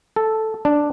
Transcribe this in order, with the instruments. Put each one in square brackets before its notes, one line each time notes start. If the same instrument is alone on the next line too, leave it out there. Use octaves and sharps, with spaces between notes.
[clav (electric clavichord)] A4
D4